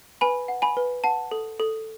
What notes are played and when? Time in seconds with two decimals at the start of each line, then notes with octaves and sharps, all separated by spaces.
0.21 B4 G#5 B5
0.48 F#5
0.62 G#5 B5
0.77 B4
1.04 F#5 A5
1.31 A4
1.60 A4